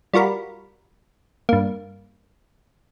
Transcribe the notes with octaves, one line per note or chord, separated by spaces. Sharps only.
G3 F4 F#4 A#4 B5
G2 A#3